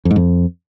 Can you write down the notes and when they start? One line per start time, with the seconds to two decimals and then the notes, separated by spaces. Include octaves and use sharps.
0.05 F2
0.11 G#2
0.16 F2